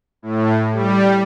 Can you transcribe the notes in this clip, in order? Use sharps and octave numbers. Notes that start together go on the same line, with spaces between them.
A2
G3